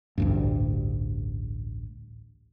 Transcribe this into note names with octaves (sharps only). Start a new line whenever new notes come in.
A1 D2 G2